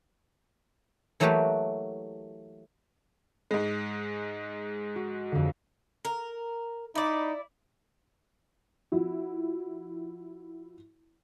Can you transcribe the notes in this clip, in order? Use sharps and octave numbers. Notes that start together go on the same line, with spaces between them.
E3 F#3 A3 A#3 G4 B4
G#2 G#3
F#4
F2 D3
A#4
D#4 E4 D5
F3 E4 F#4